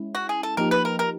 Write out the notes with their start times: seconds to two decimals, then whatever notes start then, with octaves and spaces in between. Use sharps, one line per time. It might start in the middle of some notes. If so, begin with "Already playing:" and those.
Already playing: G#3 C#4 E4
0.15 F#4
0.29 G#4
0.43 A4
0.57 F3 A#3 D#4 G4 A#4
0.71 B4
0.85 A#4
0.99 A#4